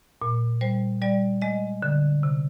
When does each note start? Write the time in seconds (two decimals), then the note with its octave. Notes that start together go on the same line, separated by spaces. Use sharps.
0.22 A#2
0.61 G3 C5
1.02 G3 D5
1.42 G#3 D#5
1.82 D3
2.23 C3